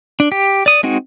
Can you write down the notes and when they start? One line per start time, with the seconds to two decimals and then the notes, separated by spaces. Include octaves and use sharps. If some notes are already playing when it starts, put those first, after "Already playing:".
0.20 D4
0.32 G4
0.66 D5 D#6
0.83 G#3 C4 D#4 F#4